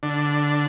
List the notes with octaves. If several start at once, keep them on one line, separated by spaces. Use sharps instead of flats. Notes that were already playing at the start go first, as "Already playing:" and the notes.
D3